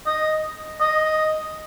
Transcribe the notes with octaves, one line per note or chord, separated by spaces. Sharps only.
D#5
D#5